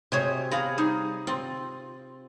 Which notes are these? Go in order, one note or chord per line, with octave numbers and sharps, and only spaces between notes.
C3 F#4 G#4 C5 C#5 D#5
B3 G#4 F5 A#5
G3 D#4 G#4
C4 F4